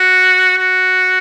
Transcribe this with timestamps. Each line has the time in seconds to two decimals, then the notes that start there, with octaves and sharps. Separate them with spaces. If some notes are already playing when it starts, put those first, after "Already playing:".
Already playing: F#4
0.57 F#4